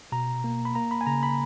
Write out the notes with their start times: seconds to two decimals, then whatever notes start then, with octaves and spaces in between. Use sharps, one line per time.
0.12 B2 A#5
0.44 A#3
0.65 B5
0.75 A#3 A#5
0.91 B5
1.01 G#5
1.07 C#3 A#5
1.23 B5